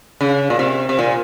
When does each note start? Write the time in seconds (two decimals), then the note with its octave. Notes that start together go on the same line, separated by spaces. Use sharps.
0.21 C#3
0.50 A#2
0.59 C3
0.89 C3
0.99 A#2